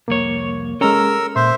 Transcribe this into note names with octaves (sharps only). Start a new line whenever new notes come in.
C2 F2 A#3 C#5
G#3 C#4 A4 A#4 A#5 E6
A#2 C5 E5 C6